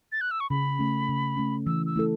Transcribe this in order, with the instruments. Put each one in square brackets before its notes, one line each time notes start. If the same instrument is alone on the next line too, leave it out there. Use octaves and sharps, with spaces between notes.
[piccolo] A6
F#6
E6
C#6
[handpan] C#3 [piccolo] B5
[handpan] A3 C#4
C#3
A3 C#4
[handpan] E3 [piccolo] E6
[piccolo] E6
[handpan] A3 E4 A4